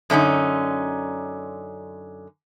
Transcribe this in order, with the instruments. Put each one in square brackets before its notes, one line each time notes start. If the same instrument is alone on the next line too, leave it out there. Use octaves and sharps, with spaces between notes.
[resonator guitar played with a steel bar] F#2 D3 C#4 D#4